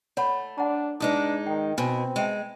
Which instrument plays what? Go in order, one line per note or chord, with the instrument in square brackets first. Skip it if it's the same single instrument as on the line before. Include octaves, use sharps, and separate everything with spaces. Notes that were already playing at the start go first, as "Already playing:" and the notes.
[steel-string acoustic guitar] A3 [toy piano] C#5 F#5 B5
[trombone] D4 [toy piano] F#5 A#5
[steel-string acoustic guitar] G#2 G#3 D#4 [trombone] D4 [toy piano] B4 A5 D#6
[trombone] D#3 [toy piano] G5
[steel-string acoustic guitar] B2 [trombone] C4 [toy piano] G#5
[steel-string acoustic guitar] G#3 [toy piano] E5 G5 A5